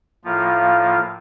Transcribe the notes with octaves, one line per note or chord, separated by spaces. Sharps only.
A2 F3 A#3 F4